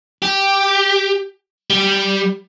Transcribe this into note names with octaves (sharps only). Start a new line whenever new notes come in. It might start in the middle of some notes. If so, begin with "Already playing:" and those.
G4
G3